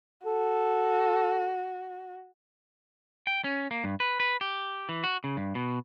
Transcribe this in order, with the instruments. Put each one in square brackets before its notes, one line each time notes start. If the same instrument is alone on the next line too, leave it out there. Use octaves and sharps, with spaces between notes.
[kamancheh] F#4 [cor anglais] A4
[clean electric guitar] G5
C#4
A#3
G2
B4
B4
G4
E3
F#4
C#3
G2
B2